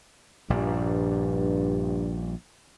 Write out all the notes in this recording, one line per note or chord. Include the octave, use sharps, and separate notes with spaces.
A#1 G2 A#2 G3